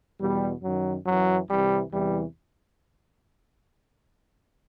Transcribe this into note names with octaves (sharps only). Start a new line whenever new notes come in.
E2 B2 G3
F#2 D#3 F#3
F#2 E3 F#3
C2 C3 E3 G3
E2 C3 E3 G3